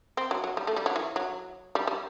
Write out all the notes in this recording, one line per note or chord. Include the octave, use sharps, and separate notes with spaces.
C4
F#3
F#3
G3
A3
G3
F#3
E3
F#3
G3
G3